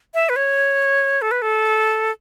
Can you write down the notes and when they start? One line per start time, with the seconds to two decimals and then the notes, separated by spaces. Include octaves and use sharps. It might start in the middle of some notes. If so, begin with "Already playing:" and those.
0.14 E5
0.29 B4
0.36 C#5
1.22 A4
1.31 B4
1.42 A4